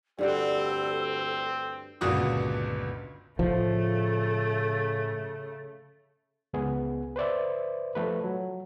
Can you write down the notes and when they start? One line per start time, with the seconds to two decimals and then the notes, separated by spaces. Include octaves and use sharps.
0.19 D2 G2 G3 C4 A4 F#5
2.01 G1 C#2 A#2 F#4 D#6
3.39 A2 C#3 F3 A3
6.53 C#2 B3 G#4
7.16 B4 C5 D5 E5
7.95 F3 A3 B4
8.24 F#3